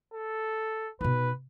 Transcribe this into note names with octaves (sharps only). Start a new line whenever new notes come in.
A4
B2 D#4 B4